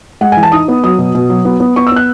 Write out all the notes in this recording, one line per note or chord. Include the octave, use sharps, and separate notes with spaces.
G#3 F#5
E3 G#5
A5
D#4 D#6
B3
F#3 D#6
B2
B2
F#3
B3
B3
B3 C#6
E6
B3 F#6